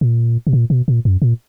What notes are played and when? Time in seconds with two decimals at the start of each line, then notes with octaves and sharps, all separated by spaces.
0.01 A#2
0.47 B2
0.53 A#2
0.70 B2
0.88 A#2
1.05 F#2
1.22 A#2